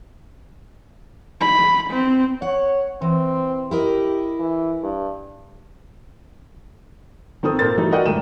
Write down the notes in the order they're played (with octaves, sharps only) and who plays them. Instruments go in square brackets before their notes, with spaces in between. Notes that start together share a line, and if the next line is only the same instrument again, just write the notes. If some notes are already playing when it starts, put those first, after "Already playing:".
[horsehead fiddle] B5
C4
[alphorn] C#5 [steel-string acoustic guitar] F#5
[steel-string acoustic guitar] E3 [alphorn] C4
[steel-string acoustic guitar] E4 A#4 D#5 [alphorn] G4
[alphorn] E3
G2
[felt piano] D#3 C4 A4 D#6
A#2 A4 A#4 C5 A6
E3 F#3 G3 A3 D#4
F#4 A#4 D5 D#5 F#5 G5
D#1 G#2 A3 G5 D#7 E7